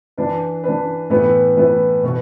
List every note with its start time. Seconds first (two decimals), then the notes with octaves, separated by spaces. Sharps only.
0.18 E3 D4 B4
0.64 E3 D4 B4
1.10 A2 E3 B3 E4 B4
1.57 A2 E3 B3 E4 B4
2.03 B2 B3 F#4